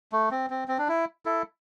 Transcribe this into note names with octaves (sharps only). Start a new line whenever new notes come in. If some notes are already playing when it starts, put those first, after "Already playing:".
A3
C4
C4
C4
D4
E4
E4 A4